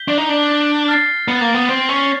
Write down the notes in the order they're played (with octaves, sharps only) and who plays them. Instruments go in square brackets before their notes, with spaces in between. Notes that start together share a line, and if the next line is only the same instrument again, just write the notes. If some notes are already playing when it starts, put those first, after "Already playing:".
Already playing: [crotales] G6 B6 G7
[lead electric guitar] D4
D#4
D4
[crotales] F6 A6 C7
[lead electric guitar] B3
A#3
B3
C4
C#4